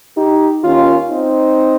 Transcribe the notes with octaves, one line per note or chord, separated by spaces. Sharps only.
D#4 G4
D#2 D#3 C#4 F4
C4 D#4